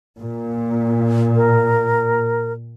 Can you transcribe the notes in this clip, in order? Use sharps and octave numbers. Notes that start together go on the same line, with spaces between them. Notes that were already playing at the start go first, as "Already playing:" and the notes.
A#2
A#4